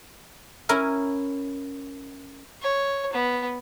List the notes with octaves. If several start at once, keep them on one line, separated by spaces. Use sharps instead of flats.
C#4 E4 A#4 G#5
C#5
B3